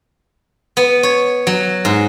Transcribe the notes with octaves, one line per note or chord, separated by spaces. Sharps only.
B3
C#5
F#3
G#2